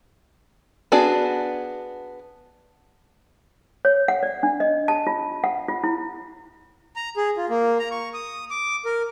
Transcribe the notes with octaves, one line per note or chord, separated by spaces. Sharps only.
B3 D4 F#4 G#4 D5
C#5
F#5
D5
D4
D#5
A5
F4
F#5
F4
E4
A#5
G#4
F4
A#3
A#5
C#6
D#6
D6
A#4